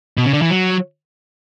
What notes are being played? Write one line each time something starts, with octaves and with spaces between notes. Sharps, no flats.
B2
C#3
D3
E3
F#3